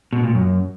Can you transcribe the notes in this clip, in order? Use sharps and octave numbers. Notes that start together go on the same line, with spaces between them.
B2
A#2
F#2